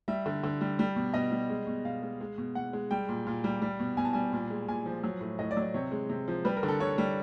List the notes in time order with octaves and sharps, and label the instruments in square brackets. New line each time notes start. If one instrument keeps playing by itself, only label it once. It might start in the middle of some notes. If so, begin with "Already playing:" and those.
[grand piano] G3 E5
D3
D3
G3
G3
B2
B2 D#5
G3
G#3
B2
B2 F5
G#3
G#3
B2
B2 F#5
G#3
G3 G5
A#2
A#2
G3
G3
B2
B2 G#5
A5
G3 G#5
A#2
G#3
A#2 G#5
F3
F#3
A2
A2 D#5
D5
F#3
D5
C3 C#5
G#3
C3
F3
G3 B4
A#4
D3
A4
D3 C#5
G3